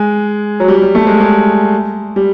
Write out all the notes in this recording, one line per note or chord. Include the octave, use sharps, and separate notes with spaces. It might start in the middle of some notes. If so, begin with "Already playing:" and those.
Already playing: G#3
F#3
G3
G3
A3
G#3
G#3
G3